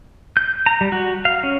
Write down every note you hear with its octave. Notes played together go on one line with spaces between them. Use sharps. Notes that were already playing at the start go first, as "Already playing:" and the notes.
G6
A#5
G3
F#4
F5
C#4